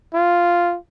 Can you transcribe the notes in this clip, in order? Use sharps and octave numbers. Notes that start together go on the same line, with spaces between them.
F4